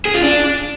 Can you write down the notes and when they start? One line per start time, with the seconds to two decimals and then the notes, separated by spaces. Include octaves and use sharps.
0.05 G#4
0.14 F4
0.23 D4